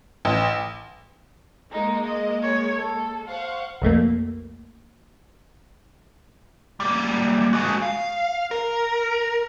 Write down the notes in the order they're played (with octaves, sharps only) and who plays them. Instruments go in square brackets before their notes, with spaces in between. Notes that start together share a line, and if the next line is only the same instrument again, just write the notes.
[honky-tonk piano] A1
[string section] G#3 A#3 [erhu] D#4
[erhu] D#5
C#5
A4
[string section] C5 F#5 C#6 [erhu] F5
[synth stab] B1 F2 A3 A#3
[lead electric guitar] G3 A#3
G#3 F#4
F5
A#4